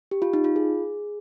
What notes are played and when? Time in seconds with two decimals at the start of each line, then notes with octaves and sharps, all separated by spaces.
0.11 G4
0.22 F4
0.34 D#4
0.44 F4
0.56 G#4